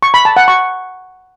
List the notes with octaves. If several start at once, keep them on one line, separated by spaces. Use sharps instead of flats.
C#6
B5
A5
F#5
C#6